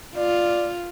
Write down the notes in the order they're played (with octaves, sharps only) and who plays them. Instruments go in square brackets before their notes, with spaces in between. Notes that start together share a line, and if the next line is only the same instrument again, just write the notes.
[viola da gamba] F4 [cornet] D5